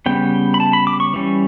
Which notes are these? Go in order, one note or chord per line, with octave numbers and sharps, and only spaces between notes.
C#3 G3 B3 G5
B5
A5
B5
D6
C#6
E3 G3 C#4